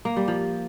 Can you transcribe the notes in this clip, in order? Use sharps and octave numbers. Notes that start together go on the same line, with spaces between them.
A#3
G3
F3